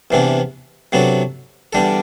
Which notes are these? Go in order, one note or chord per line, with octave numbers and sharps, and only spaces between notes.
E2 C3 E3 B3 D4
C3 F#3 B3 D4 A4
E2 D3 G3 D4 A4